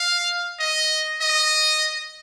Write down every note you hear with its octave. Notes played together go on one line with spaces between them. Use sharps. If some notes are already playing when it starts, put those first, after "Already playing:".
Already playing: F5
D#5
D#5